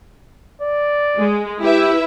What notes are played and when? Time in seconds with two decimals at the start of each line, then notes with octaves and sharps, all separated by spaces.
0.62 D5
1.18 G#3
1.62 E4 G4 B4 E5